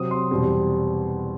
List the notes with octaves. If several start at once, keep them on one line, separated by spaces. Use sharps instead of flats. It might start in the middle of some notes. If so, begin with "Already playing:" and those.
Already playing: C3 F#3 C4 D#6
C6
E2 B2 G3 C4